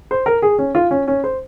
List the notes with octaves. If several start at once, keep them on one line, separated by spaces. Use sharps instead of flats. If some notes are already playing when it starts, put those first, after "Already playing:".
C5
A#4
G#4
C#4
F4
C#4
C#4
C5